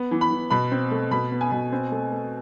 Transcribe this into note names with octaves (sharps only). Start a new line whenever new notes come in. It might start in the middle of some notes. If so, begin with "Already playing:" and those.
Already playing: B3
E3
B5
E3
B2 B5
C4
A3
B2 B5
B3
G#5
B2
C4
A3
A3